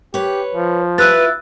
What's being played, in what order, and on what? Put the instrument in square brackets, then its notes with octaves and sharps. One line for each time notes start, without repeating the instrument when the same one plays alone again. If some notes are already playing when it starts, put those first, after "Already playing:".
[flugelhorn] G4 [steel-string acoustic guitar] B4 C#5
[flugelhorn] F3
[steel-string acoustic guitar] E4 F4 G4 [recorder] B4 [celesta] E6 F#6 A6